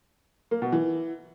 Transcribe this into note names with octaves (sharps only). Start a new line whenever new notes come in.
A#3
B2
E3